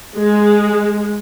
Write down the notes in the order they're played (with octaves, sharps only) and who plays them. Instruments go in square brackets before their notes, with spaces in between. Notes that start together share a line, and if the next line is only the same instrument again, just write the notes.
[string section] G#3